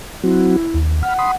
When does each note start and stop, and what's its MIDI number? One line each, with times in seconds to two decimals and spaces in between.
0.24 0.56 54
0.24 0.56 60
0.24 0.78 64
0.24 0.56 66
0.74 1.03 39
1.03 1.35 78
1.03 1.14 83
1.03 1.14 89
1.19 1.31 83
1.19 1.31 84
1.19 1.31 87